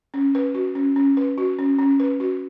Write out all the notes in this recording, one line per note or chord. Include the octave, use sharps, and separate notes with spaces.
C#4
B4
F#4
C#4
C#4
B4
F#4
C#4
C#4
B4
F#4